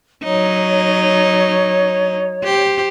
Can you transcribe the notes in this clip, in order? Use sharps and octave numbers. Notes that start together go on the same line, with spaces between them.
F#3 D#4 C#5
G4 C5